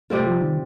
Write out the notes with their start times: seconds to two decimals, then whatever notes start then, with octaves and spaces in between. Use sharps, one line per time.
0.10 C3 G3 A3 C4 F4
0.27 F3
0.41 D#3